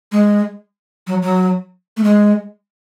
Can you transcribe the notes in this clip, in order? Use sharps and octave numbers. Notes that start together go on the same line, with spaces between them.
G#3
F#3
F#3
A3
G#3